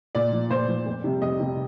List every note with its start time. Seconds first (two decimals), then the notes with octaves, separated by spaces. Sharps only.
0.15 A#2 D5
0.33 F3
0.50 A#2 C5
0.69 F3
0.86 F2
1.04 C3 G3
1.22 F2 D#5
1.40 C3 G3